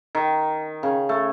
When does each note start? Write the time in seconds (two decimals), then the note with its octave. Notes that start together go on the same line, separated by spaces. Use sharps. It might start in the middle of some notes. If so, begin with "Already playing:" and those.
0.15 D#3
0.83 C#3
1.09 A3